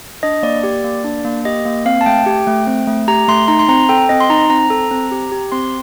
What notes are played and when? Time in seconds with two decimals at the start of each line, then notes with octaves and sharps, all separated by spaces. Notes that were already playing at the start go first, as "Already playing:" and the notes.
0.23 D4 D#5
0.43 A#3 D5
0.63 G4
0.84 A#3
1.04 D4
1.25 A#3
1.45 G4 D#5
1.65 A#3
1.86 C4 F5
2.01 A5
2.06 A3 G5
2.26 G4
2.47 A3
2.67 C4
2.87 A3
3.08 G4 A#5
3.28 A3 C6
3.48 D#4 A#5
3.59 C6
3.69 C4 A#5
3.89 A4 G5
4.09 C4 D#5
4.20 C6
4.30 D#4 A#5
4.50 C4 A#5
4.70 A4
4.91 C4
5.11 G4
5.32 G4
5.52 C4 C6